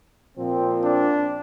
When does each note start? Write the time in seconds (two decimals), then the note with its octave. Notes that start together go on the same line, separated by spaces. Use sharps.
0.37 A#2 F3 C4
0.83 D4